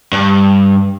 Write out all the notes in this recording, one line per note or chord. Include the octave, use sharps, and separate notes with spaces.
G2